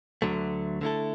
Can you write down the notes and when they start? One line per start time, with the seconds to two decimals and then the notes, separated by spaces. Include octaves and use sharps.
0.22 D2 D3 F#3 A3
0.81 D3 A3 E4 A4